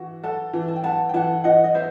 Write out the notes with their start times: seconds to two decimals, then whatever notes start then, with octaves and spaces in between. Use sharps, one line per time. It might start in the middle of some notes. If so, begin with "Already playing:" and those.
Already playing: E3 F#4
0.23 A4 F#5 A5
0.53 E3
0.68 A5
0.76 G5
0.84 B3 F#5 A5
1.09 G5
1.14 E3 F#5 A5
1.44 E3 D#5 F#5
1.64 D#5
1.74 B3 C5 E5